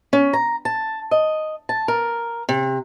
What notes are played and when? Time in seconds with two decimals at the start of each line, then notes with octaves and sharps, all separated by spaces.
0.13 C#4
0.33 A#5
0.65 A5
1.11 D#5
1.69 A5
1.88 A#4
2.49 C3